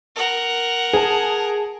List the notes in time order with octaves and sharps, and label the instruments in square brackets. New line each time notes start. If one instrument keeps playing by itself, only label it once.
[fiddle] A#4 F#5
[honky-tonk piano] G#4 A5